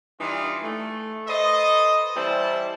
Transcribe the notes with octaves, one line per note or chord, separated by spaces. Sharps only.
E3 G3 D4 D#4 F4
A3
A4 B4 C5 D#5
E3 G3 E4 C5 A5